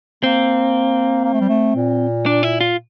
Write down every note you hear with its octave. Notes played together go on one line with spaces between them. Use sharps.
A#3 C4
A#3
A3
G3
A3
A#2
D4
E4
F4